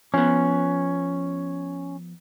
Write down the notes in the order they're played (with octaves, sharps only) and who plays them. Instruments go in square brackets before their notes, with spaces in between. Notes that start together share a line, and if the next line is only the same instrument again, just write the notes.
[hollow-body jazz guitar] F3 B3 [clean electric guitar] C#4